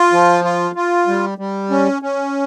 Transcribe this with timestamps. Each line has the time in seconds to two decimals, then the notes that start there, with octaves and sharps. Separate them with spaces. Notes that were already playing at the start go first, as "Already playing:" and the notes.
Already playing: F4
0.12 F3
0.44 F4
0.75 F4
1.07 G3
1.38 G3
1.70 C#4
2.02 C#4